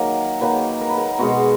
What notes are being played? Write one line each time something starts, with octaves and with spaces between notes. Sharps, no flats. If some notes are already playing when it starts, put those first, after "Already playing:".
Already playing: D#3 F#3 A#3 A#4
D#3 F#3 A#3 B4
A#4
B4
A#4
B2 G#3 B3 F#4